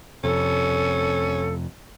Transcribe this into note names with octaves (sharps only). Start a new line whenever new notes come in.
F2 C3 C#4 A4